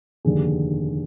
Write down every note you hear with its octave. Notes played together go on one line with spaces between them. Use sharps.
F1 D#2 D3 G#4